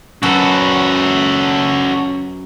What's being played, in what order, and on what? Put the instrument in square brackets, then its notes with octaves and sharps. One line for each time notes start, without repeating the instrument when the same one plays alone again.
[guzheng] F#2 B3 [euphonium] C#4 [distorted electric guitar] F#4 A4